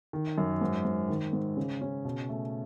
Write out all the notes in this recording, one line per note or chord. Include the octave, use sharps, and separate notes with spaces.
D#3
F#2
G#2
G#2
D#3
G#2
C#3
C#4
B2
A3